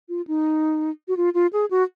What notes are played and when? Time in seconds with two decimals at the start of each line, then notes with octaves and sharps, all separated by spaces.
0.09 F4
0.27 D#4
1.08 F#4
1.17 F4
1.34 F4
1.53 G#4
1.71 F#4